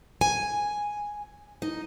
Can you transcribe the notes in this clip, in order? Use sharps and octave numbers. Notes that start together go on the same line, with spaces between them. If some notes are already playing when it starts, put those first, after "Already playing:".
G#5
D#4